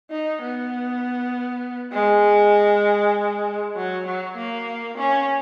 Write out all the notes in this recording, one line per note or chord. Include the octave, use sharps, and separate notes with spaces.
D#4
B3
G#3
F#3
F#3
A#3
C#4